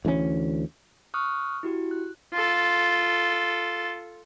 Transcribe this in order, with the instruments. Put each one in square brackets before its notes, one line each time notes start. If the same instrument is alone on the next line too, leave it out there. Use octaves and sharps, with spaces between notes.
[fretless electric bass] D2 E3 G#3 C#4
[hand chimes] C#6 D#6 F6 F#6
E4 F#4 G4
F#6
[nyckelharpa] F4 A4